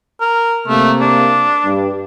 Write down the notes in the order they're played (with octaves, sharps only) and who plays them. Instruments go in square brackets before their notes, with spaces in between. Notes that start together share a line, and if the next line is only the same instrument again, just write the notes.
[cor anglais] A#4
[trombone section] C3 A#3 [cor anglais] A3
[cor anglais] D4
[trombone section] G2 G3